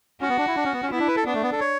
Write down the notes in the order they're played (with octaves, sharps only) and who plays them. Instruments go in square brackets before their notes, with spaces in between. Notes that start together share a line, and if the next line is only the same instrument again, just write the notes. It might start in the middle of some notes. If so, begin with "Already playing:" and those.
[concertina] C#4 [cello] F#4
[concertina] B3
D4
E4
D4
C#4
B3
C#4
[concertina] B3 [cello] E4
[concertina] D4
B4
A4
[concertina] B3 [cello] D4
[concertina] A3
B3
A4
C#5